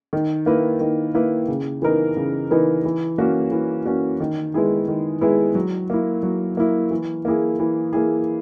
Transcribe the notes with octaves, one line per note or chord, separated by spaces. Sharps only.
D#3
A#3 E4 B4
D#3
A#3 E4 B4
C#3
E3 B3 D#4 A#4
C#3
E3 B3 D#4 A#4
E3
A#3 C#4 F#4
E3
A#3 C#4 F#4
D#3
G#3 B3 E4 G#4
D#3
G#3 B3 E4 G#4
F#3
A#3 E4
F#3
A#3 E4
E3
A#3 E4 G#4
E3
A#3 E4 G#4